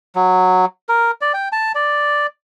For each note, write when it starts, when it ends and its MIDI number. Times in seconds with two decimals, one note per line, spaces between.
0.16 0.65 54
0.89 1.11 70
1.21 1.32 74
1.34 1.49 79
1.52 1.72 81
1.75 2.27 74